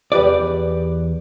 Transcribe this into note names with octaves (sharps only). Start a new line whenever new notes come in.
E2 G4 B4 D5